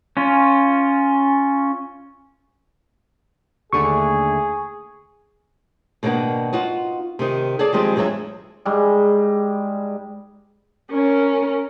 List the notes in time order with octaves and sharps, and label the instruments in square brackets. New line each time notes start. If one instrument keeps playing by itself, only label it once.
[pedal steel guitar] C#4 F4
[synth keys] D#2 D3 A3 [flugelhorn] G#4 [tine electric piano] C#6
[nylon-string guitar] B2 D#3 A#3 D4 F#4
D#4 F4 F#4
C3 D#3
G#4 A4 D5
D#3 F3 G3 G#3 C4
E2 F#3 G#3 D4 C#5 E5
[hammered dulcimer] G#2 G3
[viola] C#4 A#4